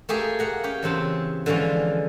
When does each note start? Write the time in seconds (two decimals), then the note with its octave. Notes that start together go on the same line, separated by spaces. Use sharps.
0.09 A3 A#3 G4 G#4
0.39 A#3 F#5 A#5
0.64 C#4 G4
0.83 E2 C#3 C4 A5
1.46 D3 E3 F3 G#3 C#4